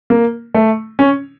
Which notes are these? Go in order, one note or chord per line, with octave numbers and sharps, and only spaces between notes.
A#3
A3
C#4